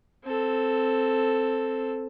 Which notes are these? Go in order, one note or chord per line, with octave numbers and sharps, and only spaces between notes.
C4 A4